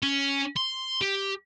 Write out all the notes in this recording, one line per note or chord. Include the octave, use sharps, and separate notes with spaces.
C#4
C6
G4